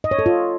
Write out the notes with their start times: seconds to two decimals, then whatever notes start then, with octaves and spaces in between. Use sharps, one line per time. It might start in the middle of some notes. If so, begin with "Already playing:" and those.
0.04 D#5
0.11 C#5
0.19 A4
0.26 F4